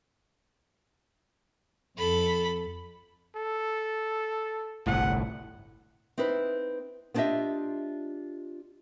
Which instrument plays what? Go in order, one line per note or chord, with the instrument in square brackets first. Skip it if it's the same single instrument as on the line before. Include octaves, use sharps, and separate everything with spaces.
[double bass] F2 [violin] A4 B5
[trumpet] A4
[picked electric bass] G1 C2 A2 [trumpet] F#5
[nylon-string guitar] C4 D#4 E4 B4
B3 D4 F4 G4 D#5 E5